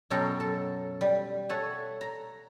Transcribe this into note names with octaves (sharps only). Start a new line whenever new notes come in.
F#2 B2 F#3 A4 G5 A#5
A4
G3
A4 C#5 E5 F#5 G#5
A#5